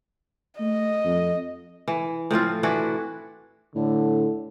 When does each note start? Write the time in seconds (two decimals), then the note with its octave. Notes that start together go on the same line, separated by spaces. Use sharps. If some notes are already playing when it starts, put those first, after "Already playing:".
0.60 A3 D#5
1.05 F2
1.88 E3
2.31 A2 F3 C4 F4
2.63 E3 D4 E4 F#4
3.75 A2 D3